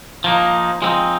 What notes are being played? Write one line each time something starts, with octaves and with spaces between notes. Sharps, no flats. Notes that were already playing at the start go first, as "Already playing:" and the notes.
F3 A#3 D#4
F3 G#3 C4 D#4